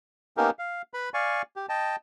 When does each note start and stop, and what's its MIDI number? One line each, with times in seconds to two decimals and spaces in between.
0.37 0.50 58
0.37 0.50 59
0.37 0.50 61
0.37 0.50 63
0.37 0.50 67
0.37 0.50 70
0.59 0.82 77
0.94 1.09 71
0.94 1.09 83
1.14 1.42 74
1.14 1.42 77
1.14 1.42 80
1.14 1.42 85
1.56 1.66 67
1.69 1.96 75
1.69 1.96 79
1.69 1.96 81